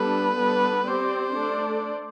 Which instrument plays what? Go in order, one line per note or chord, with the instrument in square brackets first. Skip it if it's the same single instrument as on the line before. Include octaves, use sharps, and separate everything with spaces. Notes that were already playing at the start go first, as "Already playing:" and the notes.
Already playing: [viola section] G3 B3 D4 A4 [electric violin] B4
[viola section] G3 B3 D4 A4
[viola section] C4 G4 D5 [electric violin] C5
[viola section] A3 D4 A4 D5